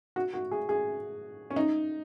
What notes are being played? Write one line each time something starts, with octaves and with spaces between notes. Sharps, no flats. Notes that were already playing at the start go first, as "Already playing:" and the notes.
F#4
F#4
G#4
G#4
C#4
D#4